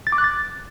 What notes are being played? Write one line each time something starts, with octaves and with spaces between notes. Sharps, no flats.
A6
D6
F#6
A6